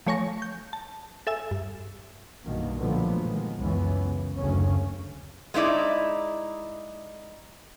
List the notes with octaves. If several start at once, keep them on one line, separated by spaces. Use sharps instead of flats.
F3 A3 C#5 G#5 C#6 A#6
G6
A5
A4 E5 G#5 E6
G2
B1 G2 B2 D#3 A#3
A#2 D3 F3 F#3 A3 B3
D#3 G#3
C#2 F#2 E3 B3 C#4
C#3
F#1 D2 C#3 F#3 C#4
G#3 D#4 E4 D5